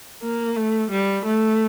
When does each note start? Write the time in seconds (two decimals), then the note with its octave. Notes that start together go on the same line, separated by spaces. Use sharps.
0.23 A#3
0.56 A3
0.91 G3
1.25 A3